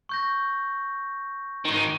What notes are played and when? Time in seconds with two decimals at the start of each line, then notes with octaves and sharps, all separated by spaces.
0.09 C#6 G6 A#6
1.65 G#2 D#3